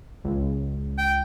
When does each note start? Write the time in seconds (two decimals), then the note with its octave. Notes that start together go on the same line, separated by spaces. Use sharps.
0.24 C#2
0.98 G5